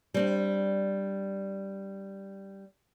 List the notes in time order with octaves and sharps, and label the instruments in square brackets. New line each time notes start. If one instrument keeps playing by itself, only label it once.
[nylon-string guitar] G3 C4 D4